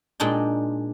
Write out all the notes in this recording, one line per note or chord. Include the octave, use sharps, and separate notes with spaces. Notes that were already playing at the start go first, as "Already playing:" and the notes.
A#2 G#3 D4 D#4 G5